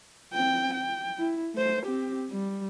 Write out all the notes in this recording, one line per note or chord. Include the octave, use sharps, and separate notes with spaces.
C4 G5
G5
E4
A3 C5
C4 G4
G3